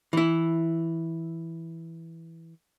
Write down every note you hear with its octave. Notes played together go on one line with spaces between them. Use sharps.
E3 E4